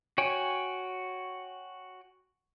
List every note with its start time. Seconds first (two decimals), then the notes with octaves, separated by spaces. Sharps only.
0.18 F#4 C#5 G5 G#5